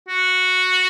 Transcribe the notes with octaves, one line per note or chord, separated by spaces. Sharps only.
F#4